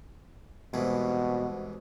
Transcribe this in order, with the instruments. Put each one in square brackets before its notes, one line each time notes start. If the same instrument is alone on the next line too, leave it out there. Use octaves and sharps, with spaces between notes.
[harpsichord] C2 G#2 E3 [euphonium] B2